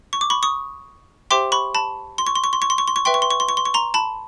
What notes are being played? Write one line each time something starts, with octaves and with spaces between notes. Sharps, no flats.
C#6
D6
B5 C#6
C#6 D#6
G4 C5 E5 G5 C6 D6
B5 C#6
A5 B5
C6
C#6
C6
C#6
C6
C#6
C6
C#6
C6
C#6
B4 E5 G5 C6
C#6
C6
C#6
C6
C#6
C6
C#6
A#5 C6
A5 B5